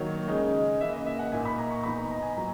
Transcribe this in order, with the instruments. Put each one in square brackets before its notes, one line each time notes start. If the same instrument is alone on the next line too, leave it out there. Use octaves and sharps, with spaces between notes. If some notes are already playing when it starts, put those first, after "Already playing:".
Already playing: [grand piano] D#3 F#3 A#3 C#5
C#3 G#3 D#4
C#3 E3 A#3 E5
D#5
E5
F#5
A#2 A#3 D#4 G#5
B5
A#5
C#6
E3 B3 D#4 B5
A#5
A#5
G#5
A#2 F#3 A#5